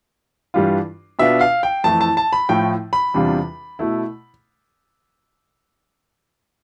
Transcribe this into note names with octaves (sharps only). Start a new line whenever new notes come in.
G2 E3 G3 D4 F4
B2 B3 D4 F4 E5
F5
G5
F2 E3 A3 E4 A5
A5
A5
B5
A2 F3 A3 E4 G5
B5
E2 C3 G3 D4 F4
B2 A3 E4